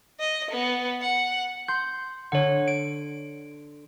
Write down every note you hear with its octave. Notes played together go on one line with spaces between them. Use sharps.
D#5
B3
F#5
C6 G6
D3 C#5 F#5
D7